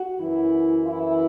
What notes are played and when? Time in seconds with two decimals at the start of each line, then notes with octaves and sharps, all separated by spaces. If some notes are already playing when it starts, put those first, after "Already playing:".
Already playing: F#4
0.20 F#2 E3 E4
0.87 E4